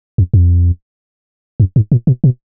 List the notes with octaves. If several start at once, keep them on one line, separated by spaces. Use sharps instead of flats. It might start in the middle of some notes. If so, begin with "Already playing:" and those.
F2
F2
F#2
G#2
A#2
B2
B2